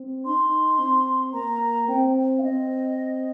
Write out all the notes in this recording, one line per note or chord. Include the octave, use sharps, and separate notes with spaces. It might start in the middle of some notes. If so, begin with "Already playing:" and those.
Already playing: C4
D#4 C6
C4
A#3 A#5
C4 G5
F5
C4 D#5